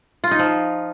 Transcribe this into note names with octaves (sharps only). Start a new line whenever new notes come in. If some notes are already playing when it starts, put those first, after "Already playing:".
F4
D#4
F3